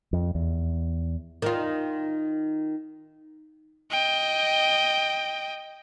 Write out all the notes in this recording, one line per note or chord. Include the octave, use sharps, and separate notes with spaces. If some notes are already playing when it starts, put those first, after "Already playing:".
F2
E2
D#3 F4
D#5 G5